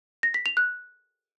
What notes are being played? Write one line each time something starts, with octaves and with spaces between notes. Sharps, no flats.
A#6
B6
F7
F#6